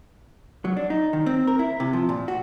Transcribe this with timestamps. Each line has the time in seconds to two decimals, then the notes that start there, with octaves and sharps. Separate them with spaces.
0.65 F#3
0.77 D4
0.90 D#4
1.13 D#3
1.26 C4
1.47 A#4
1.59 E4
1.80 C3
1.93 F3
2.09 A#2
2.28 F#4